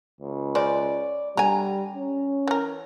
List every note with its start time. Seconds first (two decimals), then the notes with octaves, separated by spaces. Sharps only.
0.21 C#2
0.55 C#3 G#3 C5 D5
1.37 D3 G3 G#5 A#5
1.95 C#4
2.47 E3 A#4